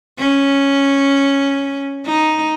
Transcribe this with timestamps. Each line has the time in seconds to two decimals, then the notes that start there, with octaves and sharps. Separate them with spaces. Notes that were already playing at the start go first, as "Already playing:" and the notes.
0.18 C#4
2.06 D#4